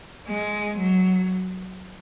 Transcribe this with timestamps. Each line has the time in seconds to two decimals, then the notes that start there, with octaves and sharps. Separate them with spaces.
0.28 G#3
0.78 F#3